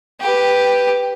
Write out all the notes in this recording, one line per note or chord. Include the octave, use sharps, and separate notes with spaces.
G4 B4